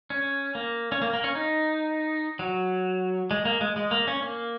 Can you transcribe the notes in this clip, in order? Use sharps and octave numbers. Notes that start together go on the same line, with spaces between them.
C#4
A#3
C#4
A#3
A#3
C#4
D#4
F#3
G#3
A#3
G#3
G#3
A#3
C#4
A#3